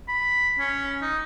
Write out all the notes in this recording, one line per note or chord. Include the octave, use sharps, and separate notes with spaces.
B5
C#4
D#4